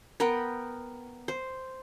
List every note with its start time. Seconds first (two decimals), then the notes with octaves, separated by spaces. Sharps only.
0.20 B3 A#4 B4 G5
1.28 C5